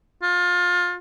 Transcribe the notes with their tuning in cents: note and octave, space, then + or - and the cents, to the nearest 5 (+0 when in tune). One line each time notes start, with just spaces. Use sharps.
F4 +25